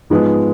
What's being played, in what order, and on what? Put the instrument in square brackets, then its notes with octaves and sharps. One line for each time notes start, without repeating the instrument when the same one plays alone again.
[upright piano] G#2 F3 G#3 B3 D#4